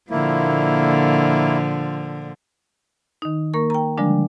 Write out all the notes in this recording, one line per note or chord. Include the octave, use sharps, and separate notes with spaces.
A#2 D3 F3 A#3 E4
D#3 D#4
A#3 A#4 C#6
G5 A#5
D3 F3 G3 G#3 D4